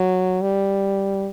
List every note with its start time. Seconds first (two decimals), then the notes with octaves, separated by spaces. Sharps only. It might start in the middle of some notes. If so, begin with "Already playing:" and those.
Already playing: F#3
0.42 G3